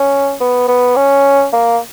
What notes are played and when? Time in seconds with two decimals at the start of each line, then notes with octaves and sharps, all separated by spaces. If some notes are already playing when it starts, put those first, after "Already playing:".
Already playing: C#4
0.41 B3
0.68 B3
0.96 C#4
1.53 A#3